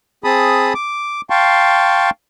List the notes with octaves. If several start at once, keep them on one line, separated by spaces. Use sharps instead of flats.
C4 G#4 A5 B5 D#6
D6
F5 G5 A5 C6 C#6